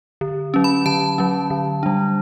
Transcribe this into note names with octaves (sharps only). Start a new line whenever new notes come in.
D3
F#3 C#4
B5
D3 A5
F#3 C#4
D3
G3 D4